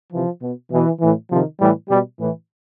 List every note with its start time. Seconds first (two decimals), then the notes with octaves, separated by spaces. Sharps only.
0.13 C3 E3 F3
0.42 B2
0.72 B2 E3
1.01 A2 E3
1.30 C3 D#3 F3
1.61 A2 E3 G3
1.90 B2 G3
2.19 A2 E3